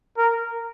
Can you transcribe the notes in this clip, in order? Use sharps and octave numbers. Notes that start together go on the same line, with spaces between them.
A#4